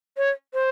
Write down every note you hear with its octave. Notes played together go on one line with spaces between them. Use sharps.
C#5
C5